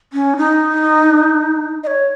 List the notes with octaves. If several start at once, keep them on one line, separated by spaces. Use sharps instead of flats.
C#4
D#4
D#5
C#5